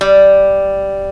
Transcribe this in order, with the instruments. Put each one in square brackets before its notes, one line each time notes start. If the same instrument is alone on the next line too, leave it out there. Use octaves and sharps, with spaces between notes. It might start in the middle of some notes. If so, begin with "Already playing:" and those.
[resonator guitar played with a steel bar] G3